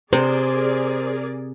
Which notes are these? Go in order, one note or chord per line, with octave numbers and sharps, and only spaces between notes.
C3 G#4 A#4 C5 D5